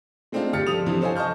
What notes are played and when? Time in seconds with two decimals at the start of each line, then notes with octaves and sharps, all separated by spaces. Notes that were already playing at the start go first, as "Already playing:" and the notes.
0.32 G#3 A3 C4 D4 D#4 F4
0.53 G1 G4 F6 A6 C#7
0.67 F3 G3 A4 D#6 F7
0.86 G2 C3 E3 F3
1.01 A4 C5 C#5 D#5 F5 G#5
1.16 D#5 A5 C#6 F6 G6